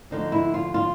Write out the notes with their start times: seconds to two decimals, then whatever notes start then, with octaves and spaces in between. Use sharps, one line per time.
0.11 D2 D3 F3 D#4
0.32 E4
0.54 F4
0.74 F4